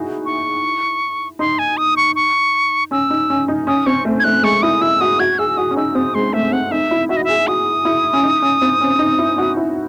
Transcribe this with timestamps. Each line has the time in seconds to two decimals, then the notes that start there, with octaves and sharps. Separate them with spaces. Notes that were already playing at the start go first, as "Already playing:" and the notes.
Already playing: D#4 E4 F#4 G#4
0.26 C#6
1.39 D#4 C6
1.59 G#5
1.77 D#6
1.97 C#6
2.16 C#6
2.91 C#4 E6
3.10 D#4
3.30 C#4
3.48 D#4
3.67 C#4 D#6
3.86 C4 C#6
4.05 A3
4.20 G#6
4.24 A3 F#6
4.43 G#3 C#6
4.62 E4 D#6
4.81 E4 E6
5.01 F#4 D#6
5.19 F#4 G#6
5.38 G#4 E6
5.57 F#4 D#6
5.71 C#4
5.76 D#4 E6
5.95 C4 D#6
6.15 G#3 C6
6.33 A3 E5
6.52 C4 F#5
6.71 D#4 E5
6.91 E4
7.09 F#4 E5
7.17 D#5
7.20 F#4
7.24 G#4 E5
7.47 F#4 D#6
7.85 E4
8.13 C#4
8.23 D#4
8.42 C#4
8.62 C4
8.81 C#4
8.99 D#4
9.18 E4
9.38 F#4
9.57 E4